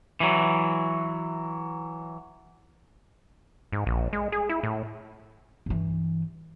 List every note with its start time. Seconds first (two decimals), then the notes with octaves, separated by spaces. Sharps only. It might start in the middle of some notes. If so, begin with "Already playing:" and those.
0.20 E3 F#3
3.72 G#2
3.87 A#1
4.13 G#3
4.32 G#4
4.49 E4
4.63 A2
5.66 G2 E3